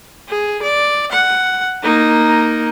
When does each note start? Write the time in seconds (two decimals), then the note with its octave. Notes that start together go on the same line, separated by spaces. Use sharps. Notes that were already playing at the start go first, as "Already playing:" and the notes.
0.28 G#4
0.63 D5
1.12 F#5
1.83 A#3 D#4